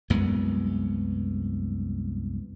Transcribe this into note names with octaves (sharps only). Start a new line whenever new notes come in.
C2 F#2 G#3 B3